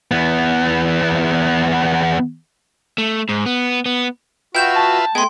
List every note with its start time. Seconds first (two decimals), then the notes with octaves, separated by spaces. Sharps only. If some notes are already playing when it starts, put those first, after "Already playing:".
0.11 E2 B3
2.98 A3
3.29 G#2
3.46 B3
3.86 B3
4.55 F4 F#4 B4 E5 G5 G6 E7
4.76 A5
5.15 A3 B3 G#4 D#5 G5 C6